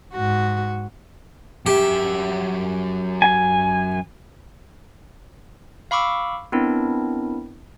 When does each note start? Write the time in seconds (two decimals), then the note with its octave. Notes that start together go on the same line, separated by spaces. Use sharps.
0.13 G#2 F#4
1.66 F#2 G4 E5
3.22 G#5
5.91 F5 B5 C#6 D6 E6
6.52 B3 C4 D4 E4 A#4